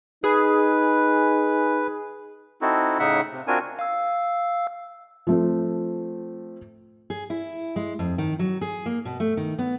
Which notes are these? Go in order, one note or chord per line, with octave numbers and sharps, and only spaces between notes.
D#4 G#4 B4
C4 D#4 E4 F#4 A4
A2 C#3 D#4 E5 F#5
C3
C4 D4 F4 F#4 A#4 G#5
F5 E6
F3 A3 C4
G#4
E4
G#3
F2
D#3
F#3
G#4
A#3
B2
A3
D#3
B3